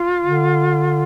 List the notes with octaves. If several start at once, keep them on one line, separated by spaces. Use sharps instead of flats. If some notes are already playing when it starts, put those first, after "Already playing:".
Already playing: F4
D3